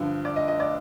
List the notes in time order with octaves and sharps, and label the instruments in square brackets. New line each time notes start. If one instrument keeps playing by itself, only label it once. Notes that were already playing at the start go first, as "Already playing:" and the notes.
Already playing: [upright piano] G2 D3 F3
[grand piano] D5
D#5
D#5
D5